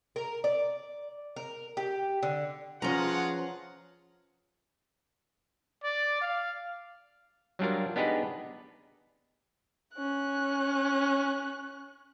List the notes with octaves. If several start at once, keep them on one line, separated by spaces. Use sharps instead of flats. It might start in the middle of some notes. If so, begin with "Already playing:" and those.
A#4
D5
A#4
G4
D3
F3 C#4 F4 G#4 B4 F#5 A#5
D5
F5
F#3 G3 D4 F4 A#4
B3 D4 D#4 G4 G#4 B4
C#4 F#6